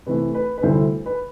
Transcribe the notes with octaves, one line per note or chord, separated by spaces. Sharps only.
C3 E3 A3 B4
B4
B4
D2 C3 G3 C4 E4 A4 C5
B4